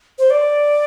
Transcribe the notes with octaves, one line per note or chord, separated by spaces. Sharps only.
C5
D5